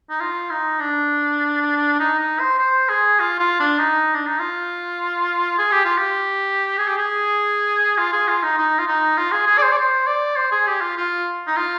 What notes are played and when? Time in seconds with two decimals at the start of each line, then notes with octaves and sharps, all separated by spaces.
0.10 D#4
0.20 F4
0.50 D#4
0.80 D4
2.00 D#4
2.19 D#4
2.40 C5
2.59 C5
2.89 G#4
3.20 F4
3.39 F4
3.60 D4
3.79 D#4
4.15 D4
4.27 D#4
4.39 F4
5.58 G#4
5.72 G4
5.85 F4
5.98 G4
6.78 G#4
6.88 G4
6.98 G#4
7.98 F4
8.13 G#4
8.28 F4
8.43 D#4
8.58 D#4
8.79 F4
8.87 D#4
9.17 F4
9.32 G#4
9.47 G#4
9.58 D5
9.63 C5
9.73 D5
9.77 C5
10.07 D5
10.36 C5
10.52 G#4
10.67 G4
10.81 F4
10.97 F4
11.47 D#4
11.57 F4